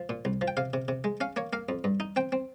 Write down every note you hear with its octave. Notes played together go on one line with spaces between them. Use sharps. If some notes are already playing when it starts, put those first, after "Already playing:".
Already playing: F3
A#2
C2
F3
G5
C3 F5
C3
C3
G#3
C#4 F5
A#3 C#5
A#3 F5
F2
G2
D#4
C4 G5
C4